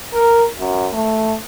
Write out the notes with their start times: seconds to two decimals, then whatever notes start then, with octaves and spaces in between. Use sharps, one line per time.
0.13 A#4
0.58 F#2
0.93 A3